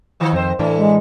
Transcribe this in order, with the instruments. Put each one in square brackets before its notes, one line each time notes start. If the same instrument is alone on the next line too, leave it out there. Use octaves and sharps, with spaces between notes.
[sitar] D#3 F3 B3
[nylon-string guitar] F2 D#3 [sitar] C4 C5
[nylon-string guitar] A2 E3 D4 [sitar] A3
[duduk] G#3